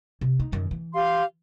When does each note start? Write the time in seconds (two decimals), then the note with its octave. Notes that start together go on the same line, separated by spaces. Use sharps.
0.21 C3
0.40 D#4
0.52 F#2 D#3
0.71 E3
0.94 G4 F5 C6